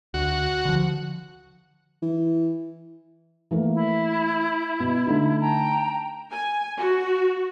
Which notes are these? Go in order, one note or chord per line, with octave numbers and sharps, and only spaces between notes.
D2 F#4
D3 F3
E3
E3 A3 A#3
E4
B2
D3 A3 D#4
G5 A5 A#5
G#5
F#4